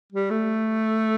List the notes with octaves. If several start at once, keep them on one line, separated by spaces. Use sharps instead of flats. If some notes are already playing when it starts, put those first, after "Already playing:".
G3
A3